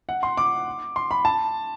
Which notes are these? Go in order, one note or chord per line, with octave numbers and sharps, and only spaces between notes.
F#5
C6
D6
C6
B5
A5